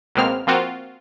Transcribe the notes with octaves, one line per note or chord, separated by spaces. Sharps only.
C#2 B2 G#3 A#3 C4 F6
F3 A#3 C4 F4 F#4